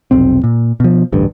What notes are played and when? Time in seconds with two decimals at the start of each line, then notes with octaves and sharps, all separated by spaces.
0.11 F1 B1 C4
0.44 A#2
0.80 B2 F3
1.12 A1 D2 G2